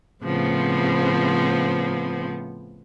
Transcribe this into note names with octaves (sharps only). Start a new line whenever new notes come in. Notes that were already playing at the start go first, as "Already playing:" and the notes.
A2 C#3 F3 B3 C4